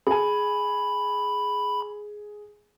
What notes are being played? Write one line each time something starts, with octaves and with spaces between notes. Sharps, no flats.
G#4 G#5 B5